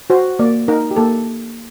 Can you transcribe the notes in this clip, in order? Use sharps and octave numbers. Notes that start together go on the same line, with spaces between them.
F#4 C5
A#3 D5
D#4 A#4
G4
A#3 A4